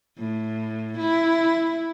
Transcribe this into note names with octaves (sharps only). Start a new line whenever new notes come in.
A2
E4